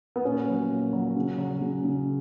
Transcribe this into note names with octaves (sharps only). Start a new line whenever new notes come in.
B3
A#2 C#4
F#3
A#2
F#3
C#3
F#3
C#3
C#3